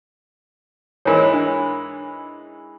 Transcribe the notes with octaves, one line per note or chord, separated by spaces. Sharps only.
G#2 E3 G#3 A#4 C#5
D4